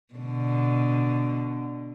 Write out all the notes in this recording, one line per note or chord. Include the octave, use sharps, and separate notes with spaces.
B2 D3